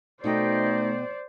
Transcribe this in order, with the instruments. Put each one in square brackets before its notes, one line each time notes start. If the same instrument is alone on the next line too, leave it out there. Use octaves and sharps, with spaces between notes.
[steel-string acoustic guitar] B2 F#4 G5 [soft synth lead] A3 [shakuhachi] D#4 [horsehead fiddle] C5 D5